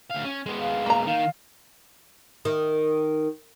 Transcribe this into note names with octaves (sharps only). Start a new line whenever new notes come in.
D2 F5
C#4
G#3 B3
F5
A#3 A#5
D#3 F5
D#3